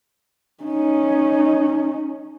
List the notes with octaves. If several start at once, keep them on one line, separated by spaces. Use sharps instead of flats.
C#4 D#4